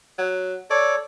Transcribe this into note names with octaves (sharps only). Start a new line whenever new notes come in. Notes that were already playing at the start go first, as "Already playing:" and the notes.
F#3
A4 C#5 D5